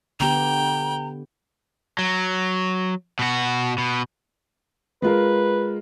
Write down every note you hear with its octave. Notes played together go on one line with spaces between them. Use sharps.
D3 B3 G4 G5 A#5
F#3
B2 F#4
B2
G#3 F4 A#4 B4